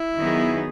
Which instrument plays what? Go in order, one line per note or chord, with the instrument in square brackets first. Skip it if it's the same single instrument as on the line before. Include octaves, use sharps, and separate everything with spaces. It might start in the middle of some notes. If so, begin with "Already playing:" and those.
Already playing: [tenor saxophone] E4
[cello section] D#3 F#3 B3 D#4 G#4